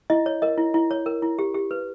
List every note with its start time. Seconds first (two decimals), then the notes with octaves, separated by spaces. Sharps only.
0.10 E4 D#5
0.26 C#5
0.42 A#4 D#5
0.58 E4
0.74 E4
0.91 C#5
1.06 A#4
1.22 E4
1.39 G4
1.54 G4
1.71 B4